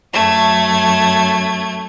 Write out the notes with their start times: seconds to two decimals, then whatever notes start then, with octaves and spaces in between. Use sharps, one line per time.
0.13 F#2 A3 G#6